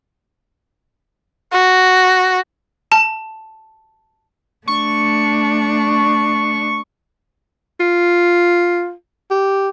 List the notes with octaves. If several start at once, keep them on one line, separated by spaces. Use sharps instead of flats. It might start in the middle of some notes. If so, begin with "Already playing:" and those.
F#4
A5
A3 D4 C#6
F4
G4